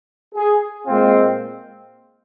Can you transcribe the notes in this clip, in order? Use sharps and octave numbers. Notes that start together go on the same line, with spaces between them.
G#4
A#2 G#3 C4 F4